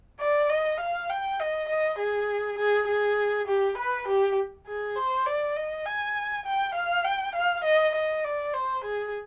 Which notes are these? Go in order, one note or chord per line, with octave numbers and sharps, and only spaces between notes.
D5
D#5
F5
G5
D#5
D#5
G#4
G#4
G#4
G4
B4
G4
G#4
C5
D5
D#5
G#5
G5
F5
G5
F5
D#5
D#5
D5
C5
G#4